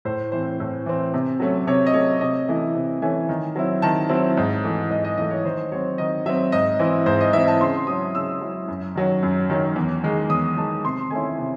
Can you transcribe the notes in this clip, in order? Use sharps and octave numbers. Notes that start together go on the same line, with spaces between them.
A2 C5
E3 C4 C5
A2
E3 C4
C3
F#3 A3 C#4
C3 C#5
D#5
F#3 A3 C#4 C#5
C3 D#5
E3 A3 C#4 E4 D#5
C3
E3 A3 C#4 E4 G#5
D#3
F#3 C4 E4
D#3 A5
F#3 C4 E4
G#2
E3 A3
G#2 D#5
D#5
E3 A3 D#5
C#5
D#3 C5
F#3 C4 C#5
D#3 D#5
F#3 C4 E5
G#2 D#5
E3 C4 E4
G#2 C5
D#5
E3 C4 E4 E5
A5
C#3 C6
F#3 C#4 E4 D#6
C#3 E6
F#3 C#4 E4
F#2
D#3 F#3 C#4
F#2
D#3 F#3 C#4
E2
D#3 G#3
E2 D#6
D#3 G#3 A5
C3 C6
D#3 A3 C#4 E4 G#5
C3